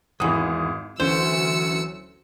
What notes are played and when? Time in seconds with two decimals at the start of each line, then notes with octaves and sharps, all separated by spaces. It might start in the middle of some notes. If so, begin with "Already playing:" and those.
0.20 G#1 E2 E3 D#6
1.00 D2 E3 F#3 C#4 C5 E6 C#7